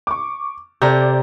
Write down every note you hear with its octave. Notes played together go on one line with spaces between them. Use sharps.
C#6 D6
C3 A4 D5 A#5 G6